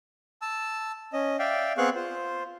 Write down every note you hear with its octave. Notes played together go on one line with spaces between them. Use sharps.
A5 E6
C#4 D#5
D5 E5 F5 G5
B3 C4 G#4 F5 C#6 F#6
F4 C5